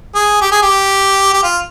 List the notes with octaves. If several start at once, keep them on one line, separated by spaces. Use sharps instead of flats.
G#4
G4
G#4
G4
G4
F4